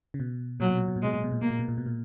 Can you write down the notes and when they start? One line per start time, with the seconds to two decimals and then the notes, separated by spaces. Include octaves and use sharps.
0.14 C#3
0.20 B2
0.60 A#2 F#3
0.70 B2
0.78 A#2
0.88 B2
0.96 A#2
1.02 B2 G#3
1.14 A#2
1.24 B2
1.32 A#2
1.42 B2 A#3
1.50 A#2
1.59 B2
1.68 A#2
1.78 B2
1.86 A#2